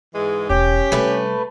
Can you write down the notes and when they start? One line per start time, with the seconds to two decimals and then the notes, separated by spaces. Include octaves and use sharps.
0.15 G#2 E3 G#3
0.50 E1 C#4 G4
0.92 C3 G3 A3 B4